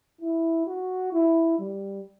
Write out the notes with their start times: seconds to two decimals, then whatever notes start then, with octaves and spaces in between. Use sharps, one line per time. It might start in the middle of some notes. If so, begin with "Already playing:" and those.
0.21 E4
0.67 F#4
1.13 E4
1.59 G3